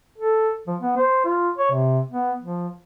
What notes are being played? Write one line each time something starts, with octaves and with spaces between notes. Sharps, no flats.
A4
F3
B3
C5
F4
C#5
C3
B3
F3